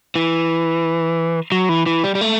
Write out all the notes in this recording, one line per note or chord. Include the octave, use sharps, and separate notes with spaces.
E3
F#3
E3
E3
G3
G3
A3